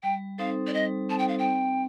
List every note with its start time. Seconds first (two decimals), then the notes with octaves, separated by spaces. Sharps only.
0.03 G3 G5
0.38 C4 D#4 A4 C5 F5
0.67 D5
0.73 G3 D#5
1.09 C4 D#4 A4 C5 A5
1.18 G5
1.28 F5
1.38 G5
1.44 C4